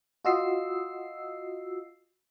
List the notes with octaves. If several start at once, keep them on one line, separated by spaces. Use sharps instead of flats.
F4 F#4 D#5 E6 C7